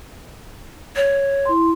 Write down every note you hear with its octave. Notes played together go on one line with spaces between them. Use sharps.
C#5
E4 C6